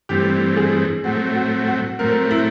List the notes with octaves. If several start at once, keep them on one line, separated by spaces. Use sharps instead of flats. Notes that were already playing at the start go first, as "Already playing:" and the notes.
G2 E3 A3 C4 G4
G#4
A2 F#3 A3 C4 F#4
F#4
F#4
A2 F#3 A3 C4 A#4
E4